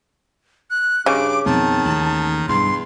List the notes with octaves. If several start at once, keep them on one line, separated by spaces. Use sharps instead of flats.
F#6
G2 C#3 D6
F2 B2 D#3 C4 A5
A1 D#2
B1 E2 G2 C6